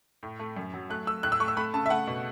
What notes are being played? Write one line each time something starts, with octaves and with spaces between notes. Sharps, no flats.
A2
A3
F#2
F#3
A3 F#6
A3 E6
A2 F#6
E6
A3 C#6
E6
A3 B5
C#3 A5
E5
A3 F#5
B2